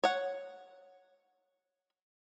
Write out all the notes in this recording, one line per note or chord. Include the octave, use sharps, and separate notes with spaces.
C#5 F#5